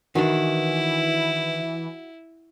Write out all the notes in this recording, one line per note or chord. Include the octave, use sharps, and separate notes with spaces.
D#3 E3 D4 E4 F#4